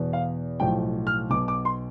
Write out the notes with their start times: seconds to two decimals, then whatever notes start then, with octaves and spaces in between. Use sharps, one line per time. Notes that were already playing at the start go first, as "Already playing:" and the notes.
Already playing: E2 B2
0.13 F5
0.60 B1 A2 F3 G5
1.07 F6
1.30 B1 B2 D6
1.48 D6
1.65 C6